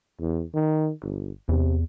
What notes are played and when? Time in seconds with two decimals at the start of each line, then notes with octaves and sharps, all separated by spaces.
0.20 E2
0.54 D#3
1.02 G1
1.49 E2 C3